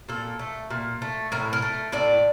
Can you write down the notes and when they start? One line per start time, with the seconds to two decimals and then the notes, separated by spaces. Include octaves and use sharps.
0.09 A#2 A4
0.39 A3
0.70 A#2
1.02 A3
1.32 A2 A#4
1.53 A#4
1.62 A3
1.92 A2 D5